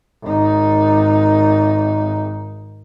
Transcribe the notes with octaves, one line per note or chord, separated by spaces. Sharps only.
G#1 D#4